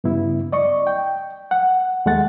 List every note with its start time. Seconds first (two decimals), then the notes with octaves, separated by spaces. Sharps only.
0.04 G2 C#3 B3 E4
0.52 D5 D#5 C#6
0.87 G5
1.51 F#5
2.06 D#2 G#3 A3 F#5 A6